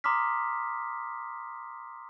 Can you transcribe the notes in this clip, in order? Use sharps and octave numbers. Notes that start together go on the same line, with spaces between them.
A#5 C6 D6 D#6 F6 B6